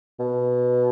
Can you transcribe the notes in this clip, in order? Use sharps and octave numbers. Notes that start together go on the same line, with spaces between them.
B2